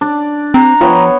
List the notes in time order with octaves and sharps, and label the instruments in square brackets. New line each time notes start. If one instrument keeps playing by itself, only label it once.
[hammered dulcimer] D4 D5
[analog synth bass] C4 [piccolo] A#5
[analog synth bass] F3 [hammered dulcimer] B3 C#5 G5